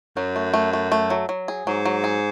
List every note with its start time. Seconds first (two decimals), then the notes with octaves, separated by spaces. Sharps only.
0.16 F#2 F#3
0.36 A3
0.54 A3
0.73 A3
0.92 A3
1.10 F#3
1.29 F#3
1.48 G#4
1.67 G#2 F#3
1.85 F#3
2.04 G#4